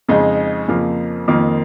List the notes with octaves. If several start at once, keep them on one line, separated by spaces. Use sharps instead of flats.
F2 C#3 G#3 D#4
F2 C#3 F3 A#3
F2 D#3 A#3 F4